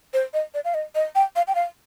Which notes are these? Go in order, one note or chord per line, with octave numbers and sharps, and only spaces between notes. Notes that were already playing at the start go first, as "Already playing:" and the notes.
C5
D#5
D5
F5
D#5
D#5
G5
F5
G5
F5